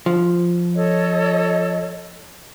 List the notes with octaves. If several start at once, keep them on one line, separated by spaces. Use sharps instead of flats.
F3
A4 C#5 D#5